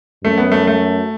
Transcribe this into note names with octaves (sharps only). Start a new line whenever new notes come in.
F#2 A3
B3
A3
A3